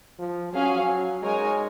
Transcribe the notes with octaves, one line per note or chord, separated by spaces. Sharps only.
F3
F#3 C#4 G#4 C#5 F5 G#5
G#3 D#4 A#4 C#5 G#5